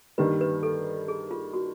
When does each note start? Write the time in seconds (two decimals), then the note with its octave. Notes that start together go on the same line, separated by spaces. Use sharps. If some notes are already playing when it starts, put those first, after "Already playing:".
0.18 G2 D#3 G3 A#3 B4
0.41 B4
0.63 A4
1.08 G#4
1.31 F4
1.53 F#4